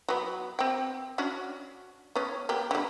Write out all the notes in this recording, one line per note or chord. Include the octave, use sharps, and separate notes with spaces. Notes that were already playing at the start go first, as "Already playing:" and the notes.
F#3 B3
C4 G5
C#4 D4 F#4
B3 C#4
A#3 B3 G4
D3 G3